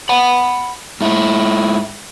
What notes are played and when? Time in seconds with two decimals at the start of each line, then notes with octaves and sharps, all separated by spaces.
0.09 F#5 B5
1.01 G#2 E4